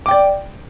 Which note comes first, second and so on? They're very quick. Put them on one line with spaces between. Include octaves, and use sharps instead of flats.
D6 G5 D5